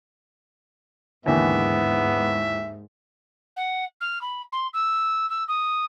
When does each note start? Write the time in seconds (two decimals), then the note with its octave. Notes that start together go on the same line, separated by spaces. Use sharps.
1.26 D#2 G#2 D3 E3 B3 E5
3.56 F#5
4.01 F6
4.21 B5
4.52 C6
4.73 E6
5.30 E6
5.48 D#6